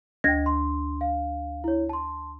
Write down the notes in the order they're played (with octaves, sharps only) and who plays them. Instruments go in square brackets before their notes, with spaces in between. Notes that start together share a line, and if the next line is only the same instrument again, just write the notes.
[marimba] D2 G#6 A#6 [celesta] D#5 G5
[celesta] C6
F5
E4 C#5
A5 C6